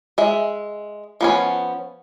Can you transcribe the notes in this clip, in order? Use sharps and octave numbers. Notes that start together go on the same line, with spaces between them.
G#3 E5
F3 B3 C#4